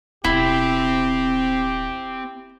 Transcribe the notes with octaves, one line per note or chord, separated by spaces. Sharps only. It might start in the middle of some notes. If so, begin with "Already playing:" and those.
D1 B2 C4 E4 G4 G5